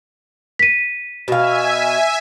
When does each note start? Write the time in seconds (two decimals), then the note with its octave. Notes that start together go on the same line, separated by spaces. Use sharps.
0.59 B6 D#7
1.28 B2 E5 F5 G#5